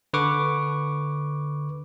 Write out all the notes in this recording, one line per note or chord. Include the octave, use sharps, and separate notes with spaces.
D3 B4 C#6 D6